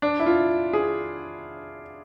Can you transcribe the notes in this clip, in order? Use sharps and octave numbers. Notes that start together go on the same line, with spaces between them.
D4
E4
F4
G#4